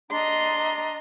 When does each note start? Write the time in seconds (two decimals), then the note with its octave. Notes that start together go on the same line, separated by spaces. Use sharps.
0.11 D4 D#5 A#5 C6